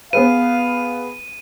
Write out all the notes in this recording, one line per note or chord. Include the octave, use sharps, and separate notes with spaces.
B3 G#4 B4 F5 D#7